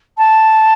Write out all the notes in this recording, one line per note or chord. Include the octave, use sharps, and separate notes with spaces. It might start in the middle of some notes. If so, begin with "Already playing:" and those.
A5